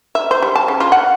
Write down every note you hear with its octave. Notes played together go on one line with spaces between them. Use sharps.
E5
C5
G3
A5
C#3
F4
F#5